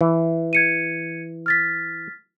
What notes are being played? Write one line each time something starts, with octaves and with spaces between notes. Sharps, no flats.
E3
G#6 C#7 D#7
F6 A6 B6